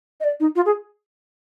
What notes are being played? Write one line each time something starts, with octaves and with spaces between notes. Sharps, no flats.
D#5
D5
D#4
F4
G#4